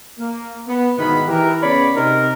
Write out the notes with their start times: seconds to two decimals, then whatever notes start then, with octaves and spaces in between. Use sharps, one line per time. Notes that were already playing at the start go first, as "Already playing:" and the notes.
0.18 A#3
0.68 B3
0.97 G#2 B2 D#3 B3 E4 B5
1.27 E3 G4 A#4
1.61 C#3 B3 C#5 D5 B5
1.95 C3 D#4 A#4